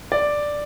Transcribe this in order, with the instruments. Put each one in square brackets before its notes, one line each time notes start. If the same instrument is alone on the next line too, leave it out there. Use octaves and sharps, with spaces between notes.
[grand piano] D5